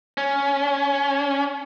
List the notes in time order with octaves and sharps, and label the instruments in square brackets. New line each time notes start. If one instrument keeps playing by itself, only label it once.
[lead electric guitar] C#4